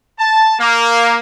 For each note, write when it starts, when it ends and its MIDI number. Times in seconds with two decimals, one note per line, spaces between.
0.19 0.57 81
0.59 1.19 58